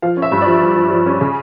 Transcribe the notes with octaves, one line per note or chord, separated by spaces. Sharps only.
F3 F5
C#4
E5
G2
D5
F3
F3
F3
F3
C#4
C#3